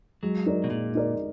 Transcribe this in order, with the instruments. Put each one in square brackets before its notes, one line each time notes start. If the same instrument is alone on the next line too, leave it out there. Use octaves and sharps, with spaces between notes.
[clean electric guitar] F#3 [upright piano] G#3
[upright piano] D#4 A#4 D5
[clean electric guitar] B2
[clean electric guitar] A#2 [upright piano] G#3
[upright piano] D#4 A#4 D5